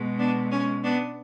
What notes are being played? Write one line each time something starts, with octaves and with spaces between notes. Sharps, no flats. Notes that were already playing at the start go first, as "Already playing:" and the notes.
Already playing: B2 G#3
B3 D4
C#4
B3 D4